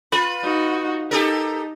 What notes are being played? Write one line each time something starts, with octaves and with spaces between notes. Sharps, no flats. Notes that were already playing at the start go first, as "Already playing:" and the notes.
F4 B4
D#4 F#4
D#4 G4 A4 A#4